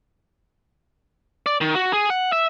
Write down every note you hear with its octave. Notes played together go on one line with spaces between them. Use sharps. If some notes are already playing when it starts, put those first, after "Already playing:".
D5
D#3
F#4
G#4
F#5
E5